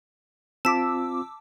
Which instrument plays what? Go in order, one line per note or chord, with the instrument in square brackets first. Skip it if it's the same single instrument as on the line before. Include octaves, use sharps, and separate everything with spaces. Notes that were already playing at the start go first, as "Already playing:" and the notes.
[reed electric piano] C4 F4 [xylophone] A5 B6 [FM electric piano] D6 E6